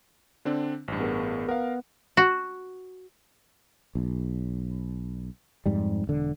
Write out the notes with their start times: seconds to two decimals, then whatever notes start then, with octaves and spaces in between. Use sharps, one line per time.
0.45 D3 C4 D4
0.88 A1 G2
1.00 B3 G#4 A#4
1.48 B3 A#4 F5
2.17 F#4
3.95 B1
5.66 F2 G#2 G3
6.07 E1 D3